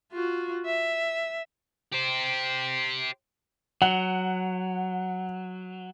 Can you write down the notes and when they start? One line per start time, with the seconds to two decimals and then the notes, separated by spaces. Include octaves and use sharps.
0.12 F4 F#4
0.66 E5
1.93 G4 C5
3.82 F#3 F#5